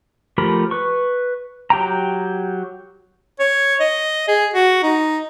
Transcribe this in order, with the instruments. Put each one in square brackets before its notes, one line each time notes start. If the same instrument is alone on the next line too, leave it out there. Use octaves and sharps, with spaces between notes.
[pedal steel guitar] F3 A3 G4 A#4 B5
B4 C#6
F#3 G4 G5 A#5
[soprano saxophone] C#5
D#5
G#4
F#4
D#4